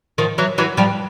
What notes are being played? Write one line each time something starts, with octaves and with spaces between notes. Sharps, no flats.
D#3 F3
E3 F#3
E3 F#3
F3 G3